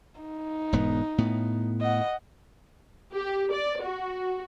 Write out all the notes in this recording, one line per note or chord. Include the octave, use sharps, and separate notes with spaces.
D#4
E1 G#2 B3
A2 B3
D#5 F#5
G4
D5
F#4